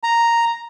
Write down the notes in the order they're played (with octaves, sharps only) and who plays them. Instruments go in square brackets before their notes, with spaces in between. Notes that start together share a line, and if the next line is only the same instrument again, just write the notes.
[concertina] A#5